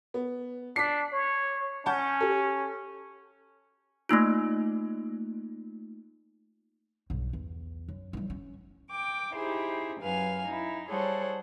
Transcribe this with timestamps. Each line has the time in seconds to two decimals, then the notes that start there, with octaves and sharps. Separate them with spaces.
0.14 B3
0.76 D4 B6 C7
1.13 C#5
1.86 C#4 F#5 A5 G6
2.21 G4 A4
4.09 A3 A#3 D#4 F4
7.10 B1 G2
7.33 E2
7.88 F#2
8.13 E3 G3
8.30 C#4
8.90 G5 D6
9.35 D#4 E4 G4 G#4 C5
10.01 F#2 F#3 B4 F5 G#5 F6
10.45 D#4 E4
10.89 G3 G#4 A4 C5 C#5 F#5